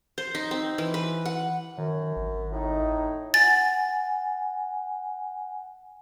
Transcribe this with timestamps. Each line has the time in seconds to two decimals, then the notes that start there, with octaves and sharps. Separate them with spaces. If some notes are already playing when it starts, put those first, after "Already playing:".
0.18 C5
0.35 D#4
0.51 C4
0.78 E3
0.94 B4
1.26 F#5
1.78 F#2 D#3
2.16 G#1
2.52 A2 D#4
3.34 F#5 G#5 A6